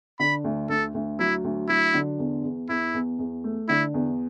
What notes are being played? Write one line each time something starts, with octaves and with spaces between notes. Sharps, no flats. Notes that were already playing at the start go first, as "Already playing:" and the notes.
D3 B5
D2
D2 A4
D2
F#3 E4
D2
F#3 E4
D3
E2
E2
E2 E4
E2
E2
A3
D3 E4
E2